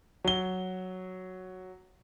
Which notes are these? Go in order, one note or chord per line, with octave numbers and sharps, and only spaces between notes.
F#3 G7